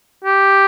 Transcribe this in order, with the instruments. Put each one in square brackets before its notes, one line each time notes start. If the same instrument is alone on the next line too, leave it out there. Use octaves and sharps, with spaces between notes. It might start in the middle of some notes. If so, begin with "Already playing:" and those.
[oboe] G4